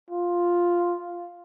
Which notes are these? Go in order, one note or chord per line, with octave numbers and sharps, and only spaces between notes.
F4